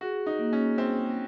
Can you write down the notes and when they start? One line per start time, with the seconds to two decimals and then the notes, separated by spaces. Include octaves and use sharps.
0.01 F#4 G#4
0.26 D#4
0.39 A#3
0.53 C#4
0.77 A#3 C4